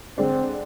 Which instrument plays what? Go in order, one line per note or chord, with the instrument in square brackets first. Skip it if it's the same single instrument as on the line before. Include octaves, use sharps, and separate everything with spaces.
[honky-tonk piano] D3 G#3 D4 [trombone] C4